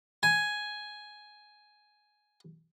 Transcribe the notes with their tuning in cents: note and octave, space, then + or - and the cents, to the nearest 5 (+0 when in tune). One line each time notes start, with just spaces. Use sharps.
G#5 +5